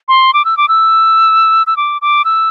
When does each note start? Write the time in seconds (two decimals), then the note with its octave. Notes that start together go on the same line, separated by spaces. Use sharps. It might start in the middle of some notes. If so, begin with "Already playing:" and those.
0.08 C6
0.34 D6
0.45 E6
0.57 D6
0.68 E6
1.67 E6
1.77 D6
2.02 D6
2.25 E6